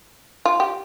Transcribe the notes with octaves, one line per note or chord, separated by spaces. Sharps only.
F4
G4